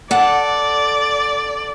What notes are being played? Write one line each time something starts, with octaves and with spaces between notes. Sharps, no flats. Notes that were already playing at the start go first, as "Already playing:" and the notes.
A4 D5 F#5